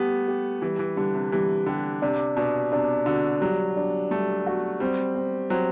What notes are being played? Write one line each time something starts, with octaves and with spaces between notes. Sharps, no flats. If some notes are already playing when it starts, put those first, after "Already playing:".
Already playing: G3 A3 B3 G4
G4
E3 G3
E3
D3 G3
C3
E3 G3
D3 G4
C3 D4
B2 D4
C3 D4
D3 F#4
F#3 G3
D4
G3 A3
F#4
G3 C4
C4
F#3 C4